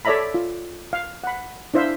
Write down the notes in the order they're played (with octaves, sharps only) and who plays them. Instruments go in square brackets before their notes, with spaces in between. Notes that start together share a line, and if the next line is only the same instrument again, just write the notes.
[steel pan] A4 C#5 D5 E5 A#5 B5
F4
F5
F#5 B5
D4 E4 C5 E5 F5